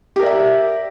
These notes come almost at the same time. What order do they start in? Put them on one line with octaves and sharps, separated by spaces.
G4 A#4 D5 E5